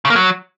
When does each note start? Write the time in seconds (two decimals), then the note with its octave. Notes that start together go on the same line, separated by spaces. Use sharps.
0.05 C#3
0.10 A#3
0.15 F#3